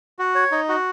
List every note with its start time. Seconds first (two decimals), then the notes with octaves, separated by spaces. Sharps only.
0.19 F#4
0.35 C#5
0.52 D#4
0.69 F#4